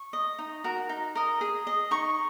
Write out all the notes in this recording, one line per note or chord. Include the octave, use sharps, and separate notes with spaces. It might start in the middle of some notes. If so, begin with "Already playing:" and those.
Already playing: C#6
D#5
D#4
F#4 A#4
D#4
A#4 D#5
G#4
D#5
D#4 C#6